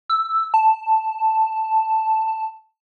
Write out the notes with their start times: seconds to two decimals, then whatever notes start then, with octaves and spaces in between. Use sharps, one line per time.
0.10 E6
0.54 A5